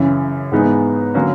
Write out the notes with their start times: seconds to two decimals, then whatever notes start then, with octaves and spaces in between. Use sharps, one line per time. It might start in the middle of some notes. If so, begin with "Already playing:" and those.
Already playing: F#2 C#3 E3
0.52 G#2 E3 G#3 B3 D#4
1.14 D3 F#3 A#3 C#4